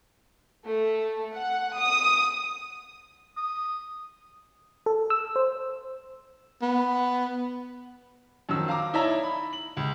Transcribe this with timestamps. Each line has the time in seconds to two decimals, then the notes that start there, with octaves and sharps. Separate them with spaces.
0.66 A3
1.34 F#5
1.79 D#6
3.37 D#6
4.86 A4
5.10 E6
5.36 C5
6.62 B3
8.49 F#2 D#3 F3 E6
8.68 F5 A#5 D6
8.93 D#4 E4 C#5 D5 E5 A#5
9.23 B5
9.53 F#7
9.77 C#2